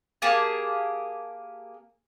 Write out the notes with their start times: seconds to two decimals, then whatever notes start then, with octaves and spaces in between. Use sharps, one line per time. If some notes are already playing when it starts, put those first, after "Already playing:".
0.22 A#3 G4 G#4 A5